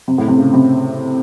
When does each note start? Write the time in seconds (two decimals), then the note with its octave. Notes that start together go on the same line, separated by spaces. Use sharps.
0.08 C3
0.18 A2
0.28 C3
0.38 C#3
0.54 C3